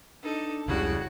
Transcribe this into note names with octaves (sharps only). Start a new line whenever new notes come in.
D4 D#4 A4
F1 C#2 C#3 G3 E4 F#4